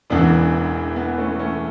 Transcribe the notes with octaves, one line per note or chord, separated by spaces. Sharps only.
E1 E2 C#3 E3 B3 D4
B3
A3 C#4
A3 C#4